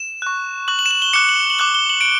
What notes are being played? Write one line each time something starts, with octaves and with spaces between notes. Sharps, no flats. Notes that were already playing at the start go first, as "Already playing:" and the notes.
Already playing: E7
C#6 F#6
C#6 F#6 F#7
F#7
E7
F#7
G7
D6 F#6 C#7
F#7
F#7
D6 F#6 G7
G7
F#7
D7